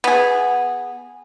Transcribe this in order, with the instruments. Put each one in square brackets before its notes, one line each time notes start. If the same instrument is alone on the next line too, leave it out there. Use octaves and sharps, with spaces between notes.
[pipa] B3 G#4